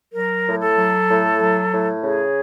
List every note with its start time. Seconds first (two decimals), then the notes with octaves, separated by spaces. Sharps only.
0.14 F#3 A#4
0.46 A2
0.61 A4
0.77 F#3
1.09 A2
1.40 F#3
1.72 A2
2.03 C#3 G#4